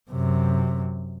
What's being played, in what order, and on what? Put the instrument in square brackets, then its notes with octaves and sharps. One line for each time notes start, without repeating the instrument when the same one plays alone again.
[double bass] F#2 C3